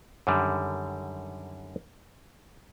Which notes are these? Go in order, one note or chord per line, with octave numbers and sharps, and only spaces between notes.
F#2 D3 D#3 G3